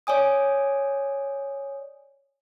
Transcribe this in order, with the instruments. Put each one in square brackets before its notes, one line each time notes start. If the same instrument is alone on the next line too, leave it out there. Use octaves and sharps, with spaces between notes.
[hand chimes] C#5 D5 G#5 D#6